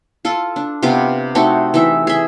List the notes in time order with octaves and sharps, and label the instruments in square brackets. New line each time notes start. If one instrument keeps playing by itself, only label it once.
[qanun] F4 A4
D4
C3 B3 F4 D6
A3 C4 D#4 F#4
E3 D#4 E5
G#4 E5